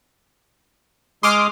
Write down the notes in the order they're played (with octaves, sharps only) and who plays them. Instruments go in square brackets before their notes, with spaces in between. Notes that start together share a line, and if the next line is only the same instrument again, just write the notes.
[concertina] G#3 G#4 D#6 [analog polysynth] C6 D6 F6